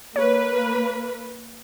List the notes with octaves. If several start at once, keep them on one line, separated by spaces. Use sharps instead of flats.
A#3 B4 C#5